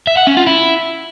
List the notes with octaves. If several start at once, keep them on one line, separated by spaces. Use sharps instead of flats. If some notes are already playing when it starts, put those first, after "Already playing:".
E5
F#5
C#4
F4
E4